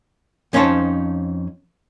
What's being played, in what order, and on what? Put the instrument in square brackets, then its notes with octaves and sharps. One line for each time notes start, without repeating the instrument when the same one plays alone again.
[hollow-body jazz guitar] F2 C#4 D#4 C5 C#5 A5